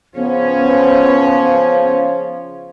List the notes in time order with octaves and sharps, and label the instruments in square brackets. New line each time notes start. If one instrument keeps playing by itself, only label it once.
[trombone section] C#3 F3 [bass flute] B3 [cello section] C#4